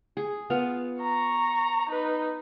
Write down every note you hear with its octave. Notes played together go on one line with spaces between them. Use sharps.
G#4
B3 F4 F5
A#5 C#6
D#4 B4